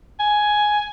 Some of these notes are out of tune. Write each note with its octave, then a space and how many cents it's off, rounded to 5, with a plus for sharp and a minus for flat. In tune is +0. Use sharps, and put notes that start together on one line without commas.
G#5 +10